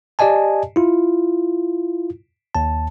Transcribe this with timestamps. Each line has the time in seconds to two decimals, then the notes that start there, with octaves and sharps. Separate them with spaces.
0.19 G4 D5 D#5 G#5 A5
0.76 E4 F4
2.54 D#2 A5